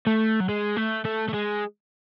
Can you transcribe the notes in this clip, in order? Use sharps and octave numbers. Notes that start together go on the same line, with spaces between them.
A3
F#3
G#3
A3
A3
A3
G#3